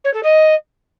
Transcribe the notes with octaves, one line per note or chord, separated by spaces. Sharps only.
C#5
A4
D#5